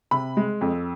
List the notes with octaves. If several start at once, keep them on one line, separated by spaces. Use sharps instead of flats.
C3 B5
G#3
F2